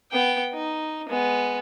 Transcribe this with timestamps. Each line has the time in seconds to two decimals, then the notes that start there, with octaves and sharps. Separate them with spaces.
0.11 B3 G5
0.54 D#4
1.09 G#3 B3